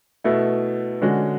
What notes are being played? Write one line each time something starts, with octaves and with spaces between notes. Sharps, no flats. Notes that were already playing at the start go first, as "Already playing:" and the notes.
B2 A3 E4
D3 G#3 C#4 F#4